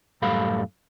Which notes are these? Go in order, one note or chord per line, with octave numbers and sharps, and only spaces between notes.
F#2 A2 G3 A4 F5 B5